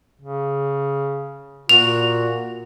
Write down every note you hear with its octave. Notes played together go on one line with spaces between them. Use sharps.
C#3
A#2 F#4 F7